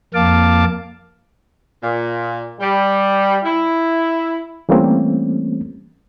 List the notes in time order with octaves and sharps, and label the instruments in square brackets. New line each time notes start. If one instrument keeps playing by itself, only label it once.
[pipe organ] F2 A#3 F5 A5 D6
[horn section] A#2
G3
E4
[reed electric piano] E3 G3 A3 A#3 C4 C#4